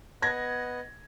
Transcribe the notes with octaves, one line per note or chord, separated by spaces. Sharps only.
B3 D#5 F#5 G#6 A#6